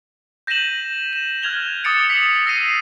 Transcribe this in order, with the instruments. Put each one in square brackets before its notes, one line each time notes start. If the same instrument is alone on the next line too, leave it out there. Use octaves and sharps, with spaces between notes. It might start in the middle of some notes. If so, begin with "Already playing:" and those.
[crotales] G6 A#6 B6 D#7 E7 F#7
E7
F6 F#6 G#6 F7 G7
D6 D#6 A6 C#7 D7
D6 B6 C#7 F#7
E6 A#6 C7 D#7 F7